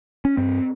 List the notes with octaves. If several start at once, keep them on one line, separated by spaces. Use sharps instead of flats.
C#4
G2 C4